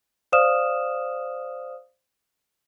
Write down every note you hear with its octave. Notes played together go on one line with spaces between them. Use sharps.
C5 D5 F5 D#6 F6 E7